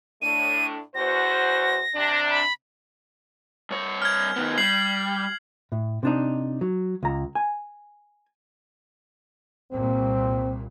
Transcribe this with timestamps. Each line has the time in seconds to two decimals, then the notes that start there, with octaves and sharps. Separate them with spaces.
0.22 A2 A3 D4 D#7
0.95 E2 F#4 C5 A#6
1.95 C3 D4
2.30 B5
3.71 G2 C#5
4.02 F6 G#6
4.36 D#3 B3
4.58 G3 C7 F#7
5.72 A2
6.03 C3 D4 D#4
6.61 F#3
7.03 C#2 A#5
7.35 G#5
9.72 C2 A#2 C4